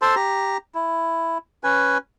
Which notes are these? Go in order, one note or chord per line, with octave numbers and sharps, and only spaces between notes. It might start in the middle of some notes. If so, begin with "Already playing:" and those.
A4 C5 A5 C6
G4 A#5
E4
C#4 B4 G#5